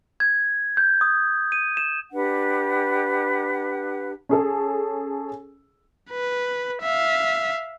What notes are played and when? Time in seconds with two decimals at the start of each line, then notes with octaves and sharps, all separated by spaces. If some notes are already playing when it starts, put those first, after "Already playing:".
0.20 G#6
0.77 G6
1.01 D#6
1.52 D#7
1.77 E7
2.12 D4 G4 B4 F#5
4.29 C#4 G#4 A4
6.10 B4
6.82 E5 F5